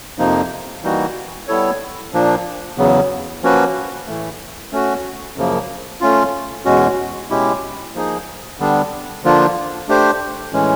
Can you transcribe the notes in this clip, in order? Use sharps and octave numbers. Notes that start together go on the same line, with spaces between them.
F2 C3 F3 A#3 D#4
E3 G3 A#3 D#4 F#4
G3 B3 E4 A4 C#5
A#2 F3 A#3 D4
E2 C#3 F#3 B3
F3 A#3 C#4 F#4 B4
A2 E3 A3
A3 C#4 F#4
F#2 C#3 F3 A#3
A3 C#4 F4
E2 B2 G#3 C#4 F#4
B2 G#3 C#4 E4 G4
F3 A#3 D#4 G#4
D3 G3 B3 D4
D3 F3 A#3 D4 F4
A3 D4 G4 C5
A2 E3 G#3 C#4